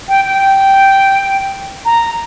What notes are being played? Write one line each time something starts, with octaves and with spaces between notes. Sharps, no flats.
G5
G5
A#5